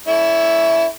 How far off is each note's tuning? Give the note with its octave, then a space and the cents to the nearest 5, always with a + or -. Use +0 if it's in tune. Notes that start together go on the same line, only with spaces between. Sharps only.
A3 +0 C#4 +40 E4 +0